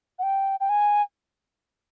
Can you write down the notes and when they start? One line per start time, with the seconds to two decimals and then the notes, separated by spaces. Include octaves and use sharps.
0.19 F#5
0.23 G5
0.60 G5
0.69 G#5